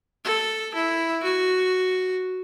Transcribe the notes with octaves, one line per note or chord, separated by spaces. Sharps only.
A4
E4
F#4